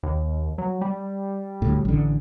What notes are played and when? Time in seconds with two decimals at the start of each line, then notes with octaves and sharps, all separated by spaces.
0.03 D#2
0.58 F#3
0.81 G3
1.62 D2 A2
1.85 A1 D3